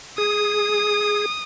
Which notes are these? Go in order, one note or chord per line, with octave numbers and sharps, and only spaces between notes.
G#4 D#6